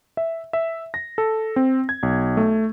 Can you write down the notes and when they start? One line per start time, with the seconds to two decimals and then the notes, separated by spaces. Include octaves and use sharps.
0.17 E5
0.53 E5
0.94 A#6
1.18 A4
1.56 C4
1.89 G#6
2.03 B1
2.37 A3